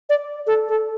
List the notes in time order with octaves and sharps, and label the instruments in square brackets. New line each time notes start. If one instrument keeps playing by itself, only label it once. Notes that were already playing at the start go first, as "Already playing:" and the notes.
[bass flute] D5
A4
A4